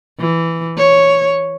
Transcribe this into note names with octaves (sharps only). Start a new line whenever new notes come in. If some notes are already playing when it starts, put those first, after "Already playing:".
E3
C#5